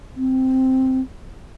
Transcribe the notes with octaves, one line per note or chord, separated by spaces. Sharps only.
C4